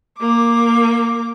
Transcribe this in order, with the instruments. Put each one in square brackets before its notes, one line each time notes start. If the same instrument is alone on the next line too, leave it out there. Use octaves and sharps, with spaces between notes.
[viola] A#3 D6